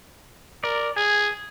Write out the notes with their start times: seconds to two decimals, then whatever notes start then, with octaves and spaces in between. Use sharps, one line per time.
0.64 A#4 D5
0.96 G#4 G#5